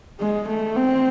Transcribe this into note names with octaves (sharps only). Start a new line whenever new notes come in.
G#3
A3
C4